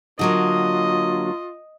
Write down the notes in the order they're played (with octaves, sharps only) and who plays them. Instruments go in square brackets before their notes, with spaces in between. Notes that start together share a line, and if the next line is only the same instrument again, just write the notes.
[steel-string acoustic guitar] D3 F#3 A#3 [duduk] F4 [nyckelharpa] D#5